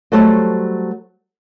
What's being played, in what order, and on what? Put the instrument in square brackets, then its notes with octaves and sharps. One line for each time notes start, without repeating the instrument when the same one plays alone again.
[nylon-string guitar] F#3 G3 A3 A4 C5 C#5